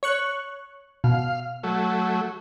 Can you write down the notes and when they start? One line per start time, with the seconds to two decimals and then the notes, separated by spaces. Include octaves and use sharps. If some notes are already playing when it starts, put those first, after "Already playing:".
0.03 C#5 C#6 F#6
1.04 B2 F5
1.63 F#3 A3